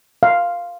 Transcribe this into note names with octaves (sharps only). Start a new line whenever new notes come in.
F5